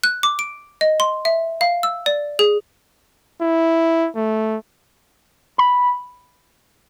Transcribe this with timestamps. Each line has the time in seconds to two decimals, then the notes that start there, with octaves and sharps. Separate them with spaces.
0.04 F#6
0.23 D6
0.39 D7
0.81 D#5
1.00 C6
1.25 E5
1.61 F5
1.83 E6
2.06 D5
2.39 G#4
3.41 E4
4.15 A3
5.58 B5